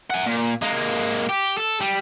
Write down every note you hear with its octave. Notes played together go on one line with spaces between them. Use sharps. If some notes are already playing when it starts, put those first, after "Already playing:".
F#5 G#5
A#2
G#3 A#3
G4
A4
G3